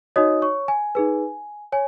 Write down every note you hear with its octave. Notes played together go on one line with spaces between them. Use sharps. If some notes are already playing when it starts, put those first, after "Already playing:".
D#4 F#4 C#5 D#5 D#6
C#5 C#6
G#5
D#4 G#4 B4
C#5 G#5